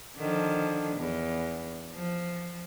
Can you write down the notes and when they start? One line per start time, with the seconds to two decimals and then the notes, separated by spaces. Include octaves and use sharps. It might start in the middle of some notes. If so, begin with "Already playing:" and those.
0.17 D3 D#3 F3
0.96 E2
1.93 F3